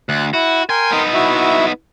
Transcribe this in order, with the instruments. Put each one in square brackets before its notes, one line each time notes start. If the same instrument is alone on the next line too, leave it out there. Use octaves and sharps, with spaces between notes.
[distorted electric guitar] D2 [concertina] F#6
[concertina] E4 [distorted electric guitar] F#4
[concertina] A#4 G5 C6 [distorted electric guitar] G#5
[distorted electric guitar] B3 D#4
[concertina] E4 F#4 E5